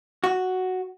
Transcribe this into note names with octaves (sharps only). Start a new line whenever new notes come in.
F#4